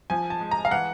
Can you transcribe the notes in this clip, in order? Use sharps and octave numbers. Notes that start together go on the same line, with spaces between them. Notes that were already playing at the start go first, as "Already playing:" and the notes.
F3 G#5
A5
G#3
A#5
F5
E3 F#5